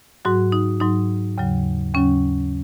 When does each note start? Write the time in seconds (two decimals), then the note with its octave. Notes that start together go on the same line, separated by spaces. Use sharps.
0.25 G#2 F#3 F#4
0.52 D#4
0.80 G#2 F#3 D#4
1.38 D#2 C#3 F#3
1.95 D#2 C#3 F#3 C#4